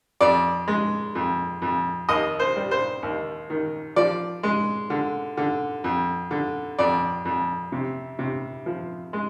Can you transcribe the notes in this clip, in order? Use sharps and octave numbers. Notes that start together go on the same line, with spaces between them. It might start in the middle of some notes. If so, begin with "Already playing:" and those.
F2 D5
G#3
F2
F2
D#2 D#5
C5
G3
C5
D#2
D#3
F3 D5
G#3
D3
D3
F2
D3
F2 D5
F2
C3
C3
F3
G#3